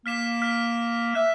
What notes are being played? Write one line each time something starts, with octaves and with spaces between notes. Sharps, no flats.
A#3 F6 B6 E7
F6 B6
E5 F#6 E7